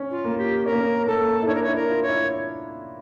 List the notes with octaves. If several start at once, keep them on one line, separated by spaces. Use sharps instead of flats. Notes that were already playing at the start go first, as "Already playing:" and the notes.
Already playing: C#4
F4
A#3
G4
C#4 A#4
A#3
C#4
A#3 A4
E4
D4 C#5
A#4
E4 C#5
A#4
F4
C#5
E4